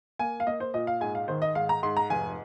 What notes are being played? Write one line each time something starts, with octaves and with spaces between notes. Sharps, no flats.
A#3 G#5
F5
A#3 D#5
C5
A#2 D#5
F5
G#2 G#5
F5
D#3 C5
D#5
G#2 F5
A#5
G#2 C6
A#5
F1 G#5